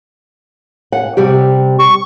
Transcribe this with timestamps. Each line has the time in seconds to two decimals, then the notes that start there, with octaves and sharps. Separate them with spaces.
0.92 F#5
1.17 C3 G3 G4
1.79 C#6